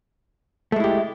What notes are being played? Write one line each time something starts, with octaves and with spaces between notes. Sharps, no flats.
G#3 A3 E4 G4